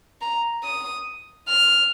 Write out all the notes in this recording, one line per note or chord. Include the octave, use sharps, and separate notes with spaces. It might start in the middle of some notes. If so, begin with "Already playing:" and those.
A#5
D#6
F6